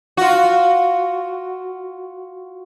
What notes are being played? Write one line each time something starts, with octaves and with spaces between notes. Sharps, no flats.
F4 F#4